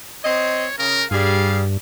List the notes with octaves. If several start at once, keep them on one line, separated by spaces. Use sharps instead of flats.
C4 C5 C#5 D#5
C#3 A#4
G2 G3 G#4 F5